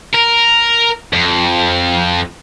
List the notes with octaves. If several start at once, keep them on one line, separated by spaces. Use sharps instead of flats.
A#4
F2